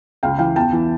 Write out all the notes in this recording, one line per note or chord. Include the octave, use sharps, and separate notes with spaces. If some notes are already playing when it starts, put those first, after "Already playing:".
C#2 F5 G5
E3 F5 G5
E2 G5 A5
E3